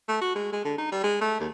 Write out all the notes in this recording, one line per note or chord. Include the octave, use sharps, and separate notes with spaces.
A3
F#4
G#3
G#3
D3
D#4
G3
G#3
A3
D#2